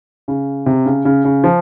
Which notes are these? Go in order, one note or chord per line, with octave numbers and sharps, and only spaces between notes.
C#3
C3
C#3
C#3
C#3
F3